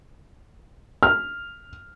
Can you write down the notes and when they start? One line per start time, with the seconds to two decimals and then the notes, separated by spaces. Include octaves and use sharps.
1.03 F6